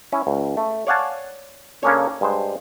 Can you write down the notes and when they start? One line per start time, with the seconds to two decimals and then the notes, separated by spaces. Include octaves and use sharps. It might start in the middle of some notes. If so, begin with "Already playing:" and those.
0.12 C#4 E4
0.27 C#2
0.57 A3
0.87 C#5 D5 F5 F#5 G#5 A5
1.83 C#3 A#3 C#4 D4 A4 C#5
2.21 G2 G#3 C5